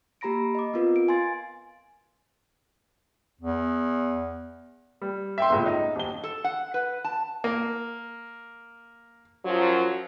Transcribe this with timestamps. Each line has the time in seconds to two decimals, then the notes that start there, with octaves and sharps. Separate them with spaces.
0.21 A#3 G4 A#5 B5 A#6 D7
0.55 D#5 D6
0.74 B3 C4 F4 A#4 B4
0.96 D7
1.08 F5 G#5 C6 A6
3.41 E2
5.01 G3
5.38 E5 G5 C6
5.50 G1 C#2 A2
5.66 D#4
5.96 D#1 G7
6.23 A4
6.44 F#5
6.74 B4
7.04 A5
7.44 A#3
9.45 F#2 F3 F#3